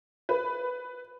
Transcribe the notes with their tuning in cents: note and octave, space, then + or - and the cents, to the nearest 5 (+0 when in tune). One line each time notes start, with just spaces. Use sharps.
B4 +10